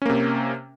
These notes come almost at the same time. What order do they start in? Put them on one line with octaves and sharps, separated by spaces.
C#4 A#3 C3